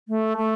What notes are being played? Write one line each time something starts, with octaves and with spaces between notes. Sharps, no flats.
A3
A3